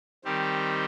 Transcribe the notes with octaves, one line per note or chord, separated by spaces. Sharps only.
D#3 G3 C4 G4